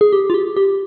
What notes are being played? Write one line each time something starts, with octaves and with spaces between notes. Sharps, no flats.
G#4
G4
F4
G4
G4